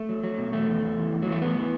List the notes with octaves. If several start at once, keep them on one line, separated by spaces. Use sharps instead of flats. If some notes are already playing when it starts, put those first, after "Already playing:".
Already playing: A3
F#3
F#3
B2
E2 A3
E2
E2
E3
E2
E3 F#3
A3
A2 B3
E3